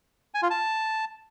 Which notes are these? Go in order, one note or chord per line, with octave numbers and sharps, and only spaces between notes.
G#5
F4
A5